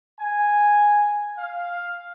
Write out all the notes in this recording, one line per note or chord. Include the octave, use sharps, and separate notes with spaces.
G#5
F5